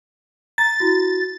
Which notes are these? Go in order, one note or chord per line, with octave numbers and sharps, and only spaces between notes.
A#5 A6
E4 F#4 A#6